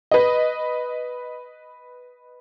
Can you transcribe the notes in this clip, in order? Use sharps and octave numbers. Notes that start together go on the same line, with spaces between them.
B4 D#5